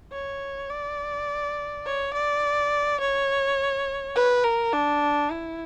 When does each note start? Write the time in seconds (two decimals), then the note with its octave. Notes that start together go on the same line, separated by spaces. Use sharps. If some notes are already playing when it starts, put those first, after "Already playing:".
0.12 C#5
0.70 D5
1.85 C#5
2.13 D5
3.00 C#5
4.16 B4
4.44 A#4
4.73 D4
5.30 E4